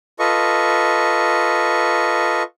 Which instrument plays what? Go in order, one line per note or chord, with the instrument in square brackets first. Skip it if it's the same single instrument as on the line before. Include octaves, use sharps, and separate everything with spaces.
[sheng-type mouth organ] F4 A4 B4 D#5 C#6